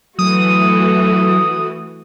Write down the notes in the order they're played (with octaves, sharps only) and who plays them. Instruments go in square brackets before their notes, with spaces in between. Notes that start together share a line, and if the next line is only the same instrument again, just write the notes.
[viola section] E3 A3 F#4 [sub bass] F#3 [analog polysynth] D#6